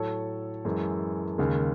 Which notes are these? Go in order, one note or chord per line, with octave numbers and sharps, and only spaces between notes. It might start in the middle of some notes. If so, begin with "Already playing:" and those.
Already playing: A2 F#3 A4 C#5
F#2 E3 G#3
D#2 C#3 G#3